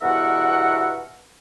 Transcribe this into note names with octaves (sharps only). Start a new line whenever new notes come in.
E2 G2 B2 A#4 E5 F#5